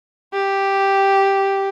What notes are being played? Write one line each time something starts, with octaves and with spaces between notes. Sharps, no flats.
G4